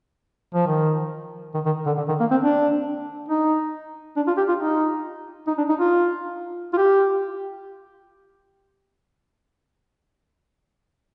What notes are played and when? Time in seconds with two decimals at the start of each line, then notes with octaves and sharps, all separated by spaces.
0.54 F3
0.67 D#3
1.54 D#3
1.66 D#3
1.86 D3
1.97 D3
2.08 D#3
2.20 A#3
2.31 C4
2.42 D4
3.29 D#4
4.17 D4
4.27 F4
4.37 G4
4.49 F4
4.60 D#4
5.47 D#4
5.58 D4
5.69 D#4
5.80 F4
6.73 F4
6.77 G4